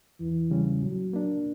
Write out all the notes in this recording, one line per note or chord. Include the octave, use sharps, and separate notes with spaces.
E2 E3
C#3 G3 C#4
A#2 F#3
A#3 D4